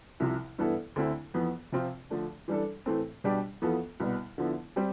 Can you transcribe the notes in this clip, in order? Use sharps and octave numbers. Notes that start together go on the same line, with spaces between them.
C2 C3 F3
G2 E3 B3 E4 A4
D2 D3 A3 C4 E4
F2 E3 B3
C3 F3 C4 F4
D3 F3 A3 D4
E3 G3 D4 A4
A2 E3 A3 C4
B2 G3 D4 G4
F2 E3 B3 F4 A4
C2 B2 G3 B3
D3 F3 B3 E4
G3 C4 G4